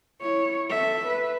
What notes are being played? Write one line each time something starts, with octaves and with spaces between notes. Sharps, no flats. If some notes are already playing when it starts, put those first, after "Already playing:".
E4 C#5
A4 E5
B4